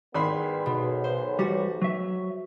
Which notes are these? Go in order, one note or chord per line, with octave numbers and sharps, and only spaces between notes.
G#1 E3 G3 B3 G#4 B5 C6
B1 B2
C5
E2 G3 F#4
F#3 E5